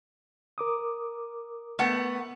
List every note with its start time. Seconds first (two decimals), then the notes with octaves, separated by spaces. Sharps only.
0.58 A#4 D6 D#6
1.79 A3 B3 F#5